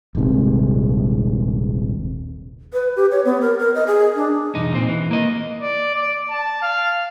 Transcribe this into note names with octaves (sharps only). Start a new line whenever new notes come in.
D#1 A#1 G#2 C3
B4
G4
C#5
B3
A#4
A#4
D#5
G#4
D4
B1 E2 D#4
A#2 C4
E3
A#3 D#5
D5
D5
A5
F5